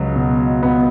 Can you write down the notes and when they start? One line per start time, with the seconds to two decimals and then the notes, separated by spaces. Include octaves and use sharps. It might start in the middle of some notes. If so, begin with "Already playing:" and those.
Already playing: C#2 F#3
0.16 B2
0.63 B3